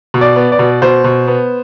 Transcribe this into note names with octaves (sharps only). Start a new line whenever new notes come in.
B2
D5
B3
D5
B2
B2 C5
B2
B3